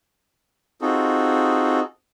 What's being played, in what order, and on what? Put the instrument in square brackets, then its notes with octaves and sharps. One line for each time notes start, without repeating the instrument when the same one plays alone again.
[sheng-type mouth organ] C4 D#4 F4 F#4 G#4 A4